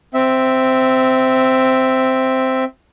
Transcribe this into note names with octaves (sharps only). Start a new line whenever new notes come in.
C4 E5